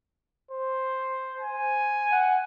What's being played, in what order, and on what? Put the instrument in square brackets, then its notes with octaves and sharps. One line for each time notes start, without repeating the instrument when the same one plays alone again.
[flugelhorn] C5
[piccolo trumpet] G#5
[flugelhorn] F#5